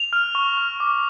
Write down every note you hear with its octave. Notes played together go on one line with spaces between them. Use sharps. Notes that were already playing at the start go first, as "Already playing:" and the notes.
Already playing: F7
F6
C#6
F6
D6